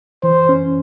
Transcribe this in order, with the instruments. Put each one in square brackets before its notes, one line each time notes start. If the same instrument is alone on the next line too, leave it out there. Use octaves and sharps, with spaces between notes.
[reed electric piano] E3 [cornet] C5
[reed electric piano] C#4